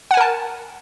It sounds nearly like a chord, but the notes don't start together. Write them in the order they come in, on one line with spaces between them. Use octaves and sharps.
F#5 G#5 A#4 A5